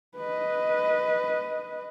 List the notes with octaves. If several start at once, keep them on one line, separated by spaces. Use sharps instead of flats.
B4 D#5